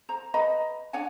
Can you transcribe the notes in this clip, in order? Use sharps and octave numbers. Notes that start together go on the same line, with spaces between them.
C5 A#5
B4 D#5 A#5 B5
D4 C#5 F#5 G#5